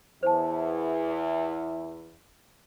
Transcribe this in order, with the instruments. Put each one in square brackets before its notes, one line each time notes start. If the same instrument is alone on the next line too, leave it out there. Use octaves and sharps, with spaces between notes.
[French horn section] E2 E4 [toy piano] C5 A5